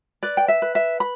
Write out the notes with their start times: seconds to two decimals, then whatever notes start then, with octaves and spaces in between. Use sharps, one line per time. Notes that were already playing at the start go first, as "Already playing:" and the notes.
0.23 B4 D5
0.37 G5
0.48 E5
0.62 B4
0.75 E5
1.00 B5